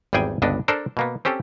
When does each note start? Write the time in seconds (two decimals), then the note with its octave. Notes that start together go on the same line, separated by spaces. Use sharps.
0.13 G#1 E2 G3 G#4 G5 G#5
0.42 G1 C#2 G2 B3 D4 D#5
0.68 D4 A4 A#4 C5
0.97 B2 A#3 B3
1.25 C4 C#4 G4 A4